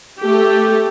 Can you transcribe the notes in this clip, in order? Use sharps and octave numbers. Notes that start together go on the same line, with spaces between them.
A3 G4